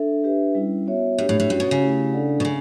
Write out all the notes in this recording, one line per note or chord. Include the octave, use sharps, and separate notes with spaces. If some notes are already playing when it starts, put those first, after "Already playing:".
Already playing: D4 A4 E5
D4 G4 B4 E5
G3 C#4 E4
B3 F#4 C#5 E5
A2 D4 G4 C#5
A2
A2
G2 C#4 F#4 C#5
B2
C#3
A3 E4 G4
D4 A4 D5 F#5
B2
C#3 C#4